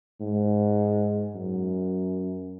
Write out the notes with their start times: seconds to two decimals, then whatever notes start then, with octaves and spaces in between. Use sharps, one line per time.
0.21 G#2
1.35 F#2